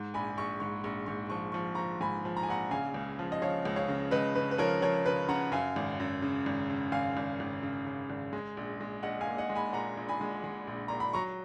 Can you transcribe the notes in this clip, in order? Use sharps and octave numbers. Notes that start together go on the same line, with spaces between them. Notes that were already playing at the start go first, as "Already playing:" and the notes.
Already playing: G#2
A#1 G#5 B5
A#1 C#6
G#2 C#6
A#1 C#6
G#2 C#6
F3 C#6
F3 C#6
F3 A#5 C#6
G#2 G#5 B5
F3
A#5
G#5
A#1 F#5 A#5
C#3 F5 G#5
C#2
F3
D#5
F3 C#5 F5
C#2
C#5 F5
C#3
C#2 B4 D#5
C#3 B4
B4
F3 A#4 C#5
F3 A#4 C#5
C#3 B4
C#3 F#5 A#5
F#2 F5 G#5
G#1
F#2
C#3
G#1
C#3
G#1 F5 G#5
G#1
G#1
C#3
C#3
G#1
G#3
A#1
G#3
A#1 D#5 F#5
F5 G#5
A#2
D#5 F#5
G#3
G#5 B5
A#2 F#5 A#5
A#1
G#5 B5
G#3
G#3
A#1
A#2 A#5
B5
F#3 A#5 C#6